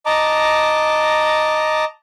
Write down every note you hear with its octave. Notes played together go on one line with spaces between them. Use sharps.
D#5 A5 A#5 D6